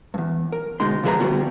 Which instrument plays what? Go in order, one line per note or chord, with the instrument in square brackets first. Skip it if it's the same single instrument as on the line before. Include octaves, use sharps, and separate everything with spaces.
[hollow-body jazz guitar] E2 G2
A#4
D2 B2 G#3 D#4 C6
C#3 F3 E4 G#4 B4 A#5
D2 G3 B3 F#4